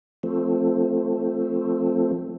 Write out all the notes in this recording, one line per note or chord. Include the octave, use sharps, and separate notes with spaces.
F3 A3 C4